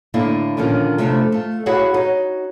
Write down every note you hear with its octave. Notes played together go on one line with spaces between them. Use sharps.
A2 D3 A#3 E4 D5 F5
A#2 D3 D#3 F3 C#4 F4
C3 F3 A3 D4 E4 F4
A3 F4
E4 F#4 G#4 C#5 F5 F#5
D#4 F#4 C#5